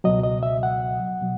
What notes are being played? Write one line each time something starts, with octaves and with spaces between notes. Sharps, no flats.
C#2 B2 F#3 D#5
D#5
E5
F#5
B2 F#3